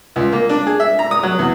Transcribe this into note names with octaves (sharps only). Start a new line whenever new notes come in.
C#2
A#3
D4
G#4
E5
A#5
D#6
F#3
E2